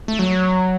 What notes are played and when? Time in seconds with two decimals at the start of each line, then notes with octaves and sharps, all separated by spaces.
0.08 A3
0.19 F#3